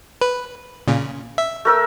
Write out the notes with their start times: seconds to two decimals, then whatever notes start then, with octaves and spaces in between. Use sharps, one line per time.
0.21 B4
0.88 A#2 C#3
1.38 E5
1.65 A3 A#4 E6